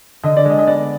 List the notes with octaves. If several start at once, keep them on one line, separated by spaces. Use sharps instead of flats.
D3 D#5
D5
G#3 D#5
D#5
B3 D5